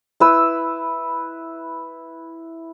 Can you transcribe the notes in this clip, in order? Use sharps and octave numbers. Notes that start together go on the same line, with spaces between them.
E4 B4 E6